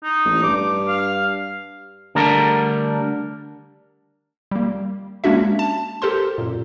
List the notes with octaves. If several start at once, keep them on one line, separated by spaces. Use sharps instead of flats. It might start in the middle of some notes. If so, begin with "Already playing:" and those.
D#4
A1
G2 D6
F5
D3 G3 A3 D4 A#4
G3 A#3
G#3 A#3 C#4 D4 F#4 E5
A5
G4 A4 A#4 C5 C6
F#2 A#2